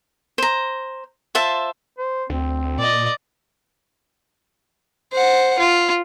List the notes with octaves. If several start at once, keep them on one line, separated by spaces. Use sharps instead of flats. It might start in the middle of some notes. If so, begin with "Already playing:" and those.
C5 A#5
F4 C5 E5 A5
C5
D2 C4
A#2 D5 D#5
C5 F#5
F4